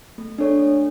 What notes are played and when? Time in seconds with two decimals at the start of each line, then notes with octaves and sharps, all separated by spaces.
0.18 A3
0.38 D4 A4 C#5
0.59 A3